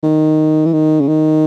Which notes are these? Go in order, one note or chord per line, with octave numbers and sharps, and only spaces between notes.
D#3
E3
D#3
C#3
D#3